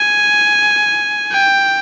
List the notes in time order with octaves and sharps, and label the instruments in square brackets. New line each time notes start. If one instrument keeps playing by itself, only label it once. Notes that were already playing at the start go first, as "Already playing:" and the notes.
Already playing: [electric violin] G#5
G5